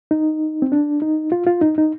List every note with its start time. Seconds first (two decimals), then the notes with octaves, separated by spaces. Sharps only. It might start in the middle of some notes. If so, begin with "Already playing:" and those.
0.11 D#4
0.62 C4
0.72 D4
1.02 D#4
1.32 F4
1.47 F4
1.61 D#4
1.78 D#4